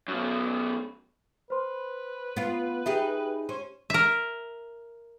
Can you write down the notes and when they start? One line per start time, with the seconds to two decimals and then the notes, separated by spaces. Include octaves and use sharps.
0.08 F#2 B2
1.50 B4 C5 C6
2.37 B3 F4
2.86 D#4 G4 G#4 E5
3.49 C#4 C5
3.90 A#4 E5